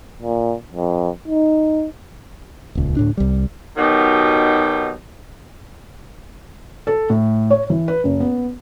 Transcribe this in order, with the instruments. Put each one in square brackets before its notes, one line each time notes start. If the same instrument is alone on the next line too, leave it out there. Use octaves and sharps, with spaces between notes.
[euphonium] A#2
F2
D#4
[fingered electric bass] D#1 C#2
D2 A2 D4
C2 G3
[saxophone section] B2 D#3 F#3 D#4 G4
[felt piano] A4
A2
C#5
E3
B4
F#1
B3